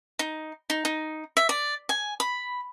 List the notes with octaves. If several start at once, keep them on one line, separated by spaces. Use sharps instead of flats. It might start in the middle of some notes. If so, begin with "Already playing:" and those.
D#4
D#4
D#4
E5
D5
G#5
B5